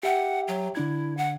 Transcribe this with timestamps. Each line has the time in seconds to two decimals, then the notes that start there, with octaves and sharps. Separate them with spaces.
0.03 G4 E5 F#5 G5
0.48 F#3
0.75 D3 D4 E4 G#6
1.17 F#5